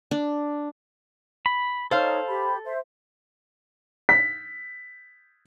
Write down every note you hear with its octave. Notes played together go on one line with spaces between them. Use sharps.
D4
B5
D#4 A4 C5 C#5 F5
G4 B5
C5 E5
B6